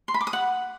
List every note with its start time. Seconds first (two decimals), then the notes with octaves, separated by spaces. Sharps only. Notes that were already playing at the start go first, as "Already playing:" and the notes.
0.08 C6
0.14 B5
0.21 D6
0.27 D#6
0.33 F#5